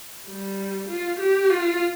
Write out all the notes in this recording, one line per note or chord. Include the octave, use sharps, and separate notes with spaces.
G3
F4
G4
F4